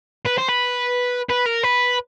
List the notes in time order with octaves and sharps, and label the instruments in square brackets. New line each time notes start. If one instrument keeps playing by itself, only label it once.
[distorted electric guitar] B4
C5
B4
B4
A#4
B4